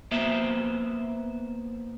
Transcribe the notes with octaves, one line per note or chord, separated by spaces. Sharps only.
A#3 B3 C5 E5